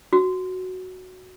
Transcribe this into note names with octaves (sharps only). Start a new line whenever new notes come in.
F#4